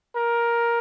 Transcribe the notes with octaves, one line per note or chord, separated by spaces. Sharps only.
A#4